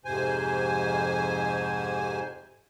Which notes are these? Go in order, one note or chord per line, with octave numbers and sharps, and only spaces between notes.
F2 G#2 C3 C5 G#5